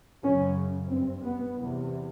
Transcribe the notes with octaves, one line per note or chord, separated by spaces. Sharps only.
F#2 C#3 C#4
G2 C4
B3
E2 C3